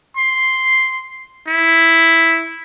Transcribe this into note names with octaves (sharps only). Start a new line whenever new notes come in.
C6
E4